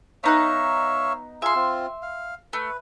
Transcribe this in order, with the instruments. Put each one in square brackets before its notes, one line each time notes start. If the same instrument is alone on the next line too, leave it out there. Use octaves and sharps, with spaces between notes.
[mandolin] B3 D#4 F#6 [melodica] C#5 E5 F5
[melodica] F4 G#4 [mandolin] E5 C6
[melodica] C4 F4
F5
[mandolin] A3 [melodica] B4